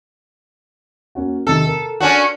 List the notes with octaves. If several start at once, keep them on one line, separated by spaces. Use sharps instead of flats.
A#3 C#4 F#4
C3 D#3 A4
A#4
C#4 D4 F#4